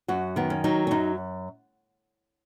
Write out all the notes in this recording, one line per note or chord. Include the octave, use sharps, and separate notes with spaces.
F#2 F#4
D#3 B3
C#4
F#3 D#4
C#4
F#2 D#4